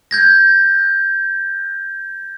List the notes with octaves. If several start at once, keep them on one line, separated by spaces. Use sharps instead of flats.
G6 G#6 A#6